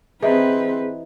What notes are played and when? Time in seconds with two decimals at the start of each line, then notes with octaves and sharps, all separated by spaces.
0.22 E3 C4 D#4 G4 G#4 B4